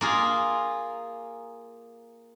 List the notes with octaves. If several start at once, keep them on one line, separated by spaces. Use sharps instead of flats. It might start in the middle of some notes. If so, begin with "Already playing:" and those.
A#3 F4 G#4